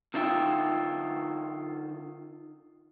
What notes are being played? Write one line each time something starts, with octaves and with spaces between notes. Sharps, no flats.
D3 D#4 F4 E5 G5